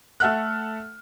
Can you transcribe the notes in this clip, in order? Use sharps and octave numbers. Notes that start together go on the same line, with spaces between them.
A3 A4 E5 F#5 F6 F#6